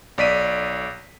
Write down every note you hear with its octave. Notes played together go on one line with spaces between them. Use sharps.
B1 D5 B6 D#7